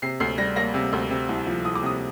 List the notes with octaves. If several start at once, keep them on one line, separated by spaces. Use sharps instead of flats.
C3 C7
D2 C7
G3 A#6
A#3 A#6
C3
D2
C3
C2
F3
C2 D#6
D6
C3 D#6